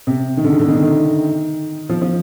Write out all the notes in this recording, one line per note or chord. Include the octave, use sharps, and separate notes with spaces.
C3
D#3
D3
C#3
D3
D#3
D3
D#3
F3
F3